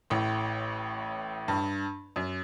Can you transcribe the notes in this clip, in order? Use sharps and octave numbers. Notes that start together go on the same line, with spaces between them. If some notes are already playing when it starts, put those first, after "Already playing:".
A1 A2
G2
F#2